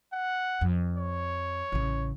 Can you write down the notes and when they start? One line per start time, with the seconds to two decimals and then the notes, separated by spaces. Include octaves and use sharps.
0.13 F#5
0.61 F2
0.98 C#5
1.72 A1 C#3